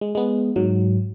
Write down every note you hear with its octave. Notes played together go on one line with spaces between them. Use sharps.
G#3
G#3 B3
G#2 F#3